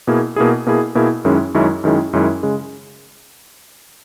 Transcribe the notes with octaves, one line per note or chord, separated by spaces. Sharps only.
B2 A#3 E4 G#4
B2 A#3 E4 G#4
B2 A#3 E4 G#4
B2 A#3 E4 G#4
F#2 D#3 G#3 C#4 E4
F#2 D#3 G#3 C#4 E4
F#2 D#3 G#3 C#4 E4
F#2 D#3 G#3 C#4 E4
C#3 G#3